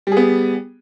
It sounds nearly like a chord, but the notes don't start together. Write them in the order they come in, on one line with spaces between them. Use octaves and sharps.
G3 G#4 B3